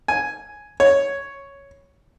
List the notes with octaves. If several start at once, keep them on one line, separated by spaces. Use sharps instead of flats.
G#5
C#5